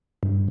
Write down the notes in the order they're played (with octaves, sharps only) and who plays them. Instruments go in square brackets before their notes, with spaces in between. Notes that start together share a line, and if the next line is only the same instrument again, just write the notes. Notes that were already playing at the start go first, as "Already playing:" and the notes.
[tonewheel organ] G2